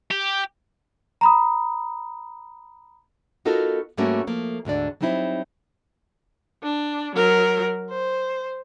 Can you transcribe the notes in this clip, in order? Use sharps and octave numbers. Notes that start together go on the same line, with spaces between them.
G4
A#5 B5 D#6
B3 D#4 F4 F#4 A4 A#4
G#2 G3 A3 A#3 C#4 F#4
F3 A3 A#3
D2 G#2 D3 D5
F#3 G3 C4 D#4 E4 C5
D4
F#3 A#4
C5